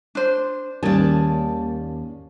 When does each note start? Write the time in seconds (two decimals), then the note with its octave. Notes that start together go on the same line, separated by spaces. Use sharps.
0.15 D4 C5
0.83 D#2 D#3 G3 A#3 C#4 G#4 D5 A5